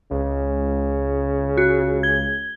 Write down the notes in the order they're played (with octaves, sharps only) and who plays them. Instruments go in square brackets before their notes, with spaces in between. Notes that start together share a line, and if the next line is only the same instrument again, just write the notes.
[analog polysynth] C#2 [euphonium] C#3
[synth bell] F#4
G#6 G7